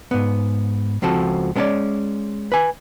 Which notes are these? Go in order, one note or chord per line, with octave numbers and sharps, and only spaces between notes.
G#2 B3
C#2 F3 C4 F#4 A4
G#3 B3 C#4 A4 C#5 D5
B4 G#5